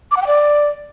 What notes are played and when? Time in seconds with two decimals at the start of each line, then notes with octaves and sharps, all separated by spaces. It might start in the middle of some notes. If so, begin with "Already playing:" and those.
0.11 D6
0.17 F#5
0.22 G5
0.27 D5